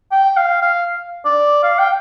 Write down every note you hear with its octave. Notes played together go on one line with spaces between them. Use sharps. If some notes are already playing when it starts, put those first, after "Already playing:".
G5
F5
F5
D5
F5
G5